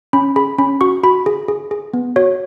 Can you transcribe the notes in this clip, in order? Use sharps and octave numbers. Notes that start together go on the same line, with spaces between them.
C#4 B5
G#4 B5
C#4 B5
F#4 C#6
F#4 B5
G#4
G#4
G#4
B3
F#4 C#5